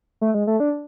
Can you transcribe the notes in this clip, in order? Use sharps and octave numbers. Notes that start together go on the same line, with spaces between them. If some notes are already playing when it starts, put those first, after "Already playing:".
A3
G#3
A3
D4